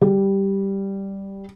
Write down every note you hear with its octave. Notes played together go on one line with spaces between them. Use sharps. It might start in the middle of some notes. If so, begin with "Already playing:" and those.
G3